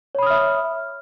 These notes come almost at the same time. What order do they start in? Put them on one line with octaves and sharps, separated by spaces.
C#5 B5 D#6 F6 E5